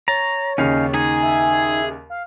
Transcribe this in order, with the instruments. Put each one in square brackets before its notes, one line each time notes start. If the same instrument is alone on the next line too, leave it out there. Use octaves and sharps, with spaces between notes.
[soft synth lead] C#5 [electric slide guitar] A#5 [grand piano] A6
[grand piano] D#2 C#3 [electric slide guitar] C#4 D#4 F5
[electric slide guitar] D#4 [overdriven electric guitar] G#4
[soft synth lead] E5
F5